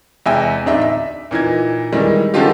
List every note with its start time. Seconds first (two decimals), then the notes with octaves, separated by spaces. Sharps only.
0.26 E2 C3 G#3 E5 G5 G#5
0.66 D1 D4 D#4 E5
0.82 E5
1.31 A#2 E3 D#4 G#6
1.92 D#3 E3 G3 G#3
2.34 D3 D#3 F3 G#3 F4 G4